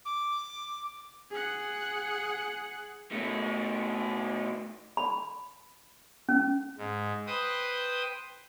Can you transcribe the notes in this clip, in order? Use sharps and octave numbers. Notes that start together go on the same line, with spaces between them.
D6
G#4 F#5
B2 A3
B5
C#4
G#2
B4 C5 G5 D#6